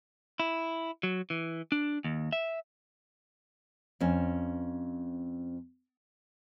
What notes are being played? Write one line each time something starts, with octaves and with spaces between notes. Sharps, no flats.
E4
F#3
E3
D4
D#2
E5
F2 C4 C#4